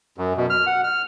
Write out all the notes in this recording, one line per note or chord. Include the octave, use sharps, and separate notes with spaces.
F#2
B2
F6
F#5
F6